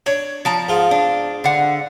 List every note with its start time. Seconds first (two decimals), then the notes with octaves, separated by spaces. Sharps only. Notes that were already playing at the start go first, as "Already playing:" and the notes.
0.06 D4 C#5
0.45 F3 A5 A#5
0.69 G#2 F4
0.91 D4
1.44 D3 F#5